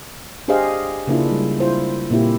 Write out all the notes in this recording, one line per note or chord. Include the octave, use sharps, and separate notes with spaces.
D4 G4 G#4 C5 D#5 F5
C#3 A#3 D4 E4 F4
G3 G#3
E4 F4 C5
A#2 A#3 C4 E4 G4